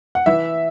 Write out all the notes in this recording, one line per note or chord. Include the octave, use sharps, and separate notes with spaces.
F#5
E3 E5